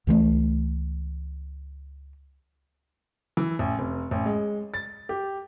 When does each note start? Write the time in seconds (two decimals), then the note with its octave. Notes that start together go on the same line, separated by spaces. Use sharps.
0.07 C#2 E3 F3 A3
3.37 E3
3.59 A1
3.79 F1
4.11 A1
4.26 G#3
4.74 A6
5.09 G4